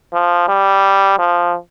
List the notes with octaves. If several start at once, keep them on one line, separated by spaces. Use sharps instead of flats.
F3
G3
F3